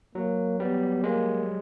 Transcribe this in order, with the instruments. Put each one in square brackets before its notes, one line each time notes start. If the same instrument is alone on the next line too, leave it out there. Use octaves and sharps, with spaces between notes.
[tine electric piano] F#3 [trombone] A#3
[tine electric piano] G3 [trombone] B3
[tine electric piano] G#3 [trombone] A#3